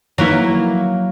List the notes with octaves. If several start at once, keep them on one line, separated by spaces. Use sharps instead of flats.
F#3 A#3 E4